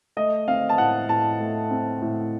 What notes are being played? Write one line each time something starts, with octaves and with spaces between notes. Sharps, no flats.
A3 D#5
C4 F5
A5
A2 F#5
A2 A5
A3
C4
A2